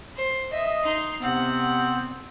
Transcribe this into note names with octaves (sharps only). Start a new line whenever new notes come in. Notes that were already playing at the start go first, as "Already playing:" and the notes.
C5
D#5 E5
D#4 C6
C3 B3 C4 F#5